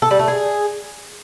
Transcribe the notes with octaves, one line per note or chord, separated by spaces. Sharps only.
A4
G3
A3
G#4